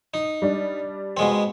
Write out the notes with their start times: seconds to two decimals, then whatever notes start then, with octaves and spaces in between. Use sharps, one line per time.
0.14 D#4
0.42 G3 D4
1.17 B2 G#3 C4